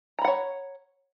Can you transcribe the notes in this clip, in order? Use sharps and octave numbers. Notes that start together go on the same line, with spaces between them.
C#5 F#5 A#5 B5